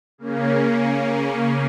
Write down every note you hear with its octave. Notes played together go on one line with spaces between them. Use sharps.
C#3 A#3 C#4